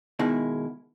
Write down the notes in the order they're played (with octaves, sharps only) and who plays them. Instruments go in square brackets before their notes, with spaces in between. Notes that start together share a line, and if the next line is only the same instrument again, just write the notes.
[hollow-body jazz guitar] B2 D#3 G#3 E4